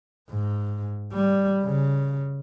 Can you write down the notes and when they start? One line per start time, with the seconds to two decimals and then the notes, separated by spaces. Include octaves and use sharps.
0.30 G#2
1.14 G3
1.64 C#3